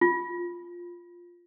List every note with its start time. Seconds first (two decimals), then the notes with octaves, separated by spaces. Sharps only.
0.01 F4